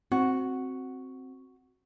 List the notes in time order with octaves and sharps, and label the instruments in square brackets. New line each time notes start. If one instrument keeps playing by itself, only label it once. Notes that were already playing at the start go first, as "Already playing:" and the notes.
[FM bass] C4 [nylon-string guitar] F#4